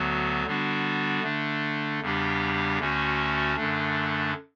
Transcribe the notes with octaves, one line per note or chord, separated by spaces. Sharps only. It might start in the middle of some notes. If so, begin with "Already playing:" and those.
Already playing: D2 D3 F#3 B3 F#4
D3 G3 B3 D4 F#4
D3 A3 D4
E2 C#3 G3 D4 G4
D2 D3 A3 C#4 F#4
F#2 D3 A3 D4